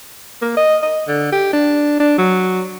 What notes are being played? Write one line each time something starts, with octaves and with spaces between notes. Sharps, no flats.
A#3
D#5
D#5
D3
G4
D4
D4
F#3